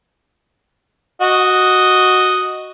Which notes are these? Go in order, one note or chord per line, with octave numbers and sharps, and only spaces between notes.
F#4 D#5